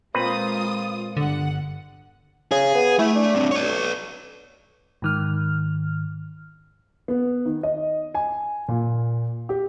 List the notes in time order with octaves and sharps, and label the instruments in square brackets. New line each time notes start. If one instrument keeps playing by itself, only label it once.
[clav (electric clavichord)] A#2 C4 B4 [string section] G#3 F4 D#6
[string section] G1 F#5 [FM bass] D3
[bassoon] C#3 [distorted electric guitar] G#4
[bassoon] B3
[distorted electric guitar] A3 E5 [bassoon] E4
[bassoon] D4
[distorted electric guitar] G2 C3
B4 C#5
[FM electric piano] G#2 D#3 F6
[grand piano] B3
D#3
D#5
G#5
A#2
G4